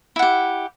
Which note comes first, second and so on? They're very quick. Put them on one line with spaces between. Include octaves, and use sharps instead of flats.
E4 F#5 G4